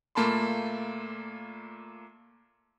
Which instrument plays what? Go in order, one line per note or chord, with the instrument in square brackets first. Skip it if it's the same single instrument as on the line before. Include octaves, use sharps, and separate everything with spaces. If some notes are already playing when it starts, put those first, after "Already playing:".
[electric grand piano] A#2 A3 A#3 A5 B5 C6